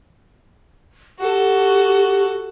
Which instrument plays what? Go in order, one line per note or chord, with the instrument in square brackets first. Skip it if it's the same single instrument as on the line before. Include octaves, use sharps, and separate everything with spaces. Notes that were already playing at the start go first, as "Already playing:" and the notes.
[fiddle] F#4 A4 [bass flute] G4